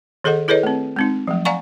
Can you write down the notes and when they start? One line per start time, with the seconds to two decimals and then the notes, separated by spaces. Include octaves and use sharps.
0.24 D#3 G#4 A4 D#5 F#5
0.48 E4 G#4 A4 B4 C#5 D#5
0.63 A3 C4
0.96 G#3 C4 D#4
1.27 F3 F#3 A3
1.45 D5 F5 F#5 G#5 A#5 C#6